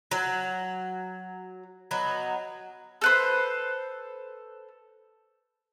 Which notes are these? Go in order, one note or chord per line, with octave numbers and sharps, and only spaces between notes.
F#3
F#3 B3 D#4
A4 B4 C5